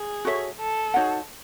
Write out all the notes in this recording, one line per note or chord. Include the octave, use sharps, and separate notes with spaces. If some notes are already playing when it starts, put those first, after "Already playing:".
Already playing: G#4
F#4 A4 C#5 E5
A4
D#4 F#4 C#5 F#5